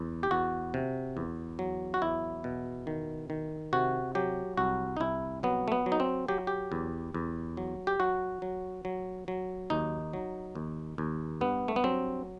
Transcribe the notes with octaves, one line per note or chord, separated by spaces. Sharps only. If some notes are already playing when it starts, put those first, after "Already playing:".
Already playing: E2
G4
E2 F#4
C3
E2
F#3
F#4
E2 E4
B2
D#3
D#3
C3 F#4
F#3 G4
C2 F#4
D#4
C2 E4
F#3 B3
A3
B3
F#3
D#4
C4
F#3 G4
G4
E2
E2
F#3
G4
F#3 F#4
F#3
F#3
F#3
D#2 D#4
F#3
D#2
D#2
G2 B3
A3
B3
F#3 C4